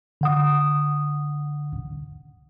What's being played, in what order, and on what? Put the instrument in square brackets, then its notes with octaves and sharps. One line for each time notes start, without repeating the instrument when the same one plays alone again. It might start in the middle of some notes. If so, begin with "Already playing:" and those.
[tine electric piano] D3 F#5 D#6